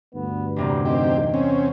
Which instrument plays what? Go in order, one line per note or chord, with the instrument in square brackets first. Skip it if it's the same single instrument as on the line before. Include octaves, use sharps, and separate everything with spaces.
[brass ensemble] D2 G2 [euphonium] B3
[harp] E2 C3 A#3 [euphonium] G3
[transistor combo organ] C4 G4 [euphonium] D#4
[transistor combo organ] C4 C#4